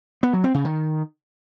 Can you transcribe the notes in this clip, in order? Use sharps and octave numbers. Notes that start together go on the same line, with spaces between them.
B3
F#3
C4
C#3
D#3